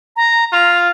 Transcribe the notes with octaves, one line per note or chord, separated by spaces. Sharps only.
A#5
F4 F7